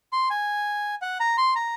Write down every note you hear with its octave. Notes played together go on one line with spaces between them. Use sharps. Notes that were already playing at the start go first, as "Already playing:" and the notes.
C6
G#5
F#5
A#5
C6
A#5